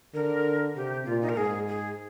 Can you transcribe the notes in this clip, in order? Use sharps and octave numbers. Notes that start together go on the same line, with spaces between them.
D3 A#4
C3 G4
A#2 F4
D#4
A#4
G#2 G#4
G#4